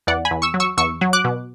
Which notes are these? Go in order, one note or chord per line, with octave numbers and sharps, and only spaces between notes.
E2 D5 F#5
G#5 B5
E2
C#6 E6
F#3
C#6 E6
E2 C#6 E6
F#3
D6 F#6
B2